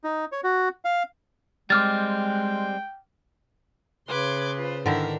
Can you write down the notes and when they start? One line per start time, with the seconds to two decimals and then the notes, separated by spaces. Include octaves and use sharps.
0.04 D#4
0.32 C#5
0.44 F#4
0.85 F5
1.70 G3 G#3 C4 G5 D6 F6 A6
4.08 C#3 B4 C6 D6 G#6
4.57 F4 C5
4.86 G#2 D3 D#3 D4 E4 A#4 E5